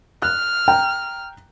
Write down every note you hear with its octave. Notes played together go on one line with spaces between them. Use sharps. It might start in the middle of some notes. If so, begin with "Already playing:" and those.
F6 F#6
G5 A#5